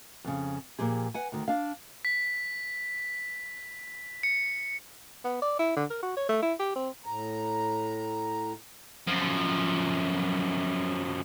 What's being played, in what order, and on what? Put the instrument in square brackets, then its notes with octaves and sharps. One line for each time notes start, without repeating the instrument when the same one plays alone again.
[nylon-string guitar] F2 C#3
A#2 F3 G4 G#4
B4 F#5 G#5
D2 D#3
D4 F5
[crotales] B6
C#7
[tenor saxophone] B3
D5
E4
D3
A#4
F#4
C#5
A3
E4
G4
C4
[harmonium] A2 A#5
[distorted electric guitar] F#2 F3